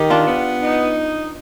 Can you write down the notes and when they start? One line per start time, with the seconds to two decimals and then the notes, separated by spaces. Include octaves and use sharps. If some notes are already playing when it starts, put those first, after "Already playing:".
Already playing: D#3 G4
0.10 D4 F4
0.27 B3
0.62 D#4